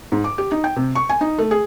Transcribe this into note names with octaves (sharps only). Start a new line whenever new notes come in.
G#2
D6
G4
D#4
G5
C3
C#6
G#5
D#4
A3
G#4